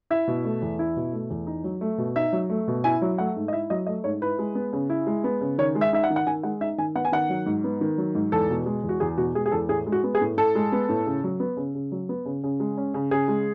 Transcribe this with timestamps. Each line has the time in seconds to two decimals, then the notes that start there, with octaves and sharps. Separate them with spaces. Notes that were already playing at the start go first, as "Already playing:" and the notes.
0.10 E4 E5
0.28 B2
0.45 A3
0.62 E2
0.79 E4
0.97 B2
1.13 A3
1.30 E2
1.47 D#4
1.64 F#3
1.81 A3
1.98 B2
2.16 D#4 E5
2.33 F#3
2.50 A3
2.68 B2
2.84 E4 G#5
3.02 F#3
3.18 A3 F#5
3.36 G#2
3.48 D#5
3.53 E4 E5
3.70 F#3 D#5
3.86 A3 D#5
4.04 G#2 C#5
4.21 E4 B4
4.39 G#3
4.55 B3
4.73 C#3
4.90 E4
5.07 G#3
5.24 B3
5.41 C#3
5.58 D#3 C#5
5.75 G#3
5.81 E5
5.93 D#4 E5
6.04 F#5
6.10 D#3
6.16 F#5
6.27 D#3 G#5
6.43 G#3 F#5
6.61 D#4 E5
6.78 D#3 G#5
6.95 B3 F#5
7.05 G#5
7.12 D#3 F#5
7.30 F#3
7.46 G#2
7.64 B3
7.81 D#3
7.98 F#3
8.15 G#2
8.32 E2 A4
8.50 B2
8.66 G#3
8.84 E2
8.89 F#4
9.00 E2 G#4
9.18 B2 F#4
9.35 G#3 G#4
9.46 G#4
9.51 E2 A4
9.69 A2 G#4
9.86 G#3
9.92 F#4
10.04 B3
10.15 G#4
10.21 A2
10.37 A2 A4
10.55 G#3
10.72 B3
10.89 A2
11.06 C#3
11.24 F#3
11.40 B3
11.57 C#3
11.75 C#3
11.92 F#3
12.09 B3
12.25 C#3
12.43 C#3
12.60 G#3
12.77 C#4
12.94 C#3
13.11 C#3 G#4
13.28 G#3